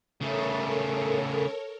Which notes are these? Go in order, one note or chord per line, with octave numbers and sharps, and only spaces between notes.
C#3 A3 A4 A#4 C#5